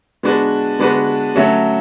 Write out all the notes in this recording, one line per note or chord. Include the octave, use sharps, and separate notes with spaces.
G#3 B3 D4 F#4 B4
G#3 B3 D4 F#4 B4
F#3 A3 C#4 F#4